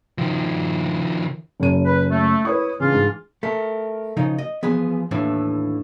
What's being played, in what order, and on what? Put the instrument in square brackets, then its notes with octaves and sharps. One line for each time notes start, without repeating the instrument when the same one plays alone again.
[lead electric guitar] D#3 F3
[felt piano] F#1 F#2 D#7
[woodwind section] B4
A3
[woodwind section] E4 D#6 [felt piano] B4 C#5 C#6
[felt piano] C#3 [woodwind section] E3 D4 F4
[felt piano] G#2
[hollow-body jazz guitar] A3 [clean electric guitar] A#4 A5
[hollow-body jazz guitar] C#3 F3 D#4
D#5
[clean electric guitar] E3 F3 [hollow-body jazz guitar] B3 G#4 B4
[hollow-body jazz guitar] D#2 A2 E3 [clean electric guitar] D4